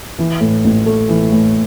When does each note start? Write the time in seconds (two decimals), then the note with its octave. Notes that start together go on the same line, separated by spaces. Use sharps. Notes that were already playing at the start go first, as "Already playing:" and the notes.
0.19 E3
0.41 A2
0.64 A1
0.86 A3
1.09 E3
1.32 A2